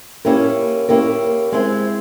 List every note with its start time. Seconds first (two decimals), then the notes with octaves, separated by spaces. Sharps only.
0.25 A#3 C#4 E4 G4 A#4
0.89 A#3 C#4 E4 G4 A#4
1.52 G#3 C4 E4